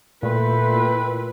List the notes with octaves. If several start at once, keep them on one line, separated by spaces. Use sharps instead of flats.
A#2 A3 E4 B4 G5 B5 C6